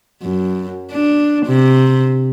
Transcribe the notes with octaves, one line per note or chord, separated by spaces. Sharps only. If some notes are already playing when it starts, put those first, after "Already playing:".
F#2
D4
C3